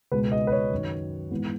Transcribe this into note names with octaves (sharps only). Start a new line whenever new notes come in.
C#2 B2 G#3 B4
D#5
B4
C#5
F#2 D#3 F#3
G#2 E3 B3